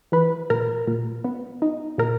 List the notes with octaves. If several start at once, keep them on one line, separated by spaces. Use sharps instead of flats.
E3 B4
A#2 A#4
A#2
B3
D#4
A#2 A#4